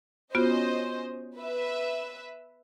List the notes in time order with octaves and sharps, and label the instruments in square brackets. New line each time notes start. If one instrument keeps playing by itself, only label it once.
[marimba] B3 F4 F#4 [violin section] C#4 C5 D#5
[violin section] B4 E5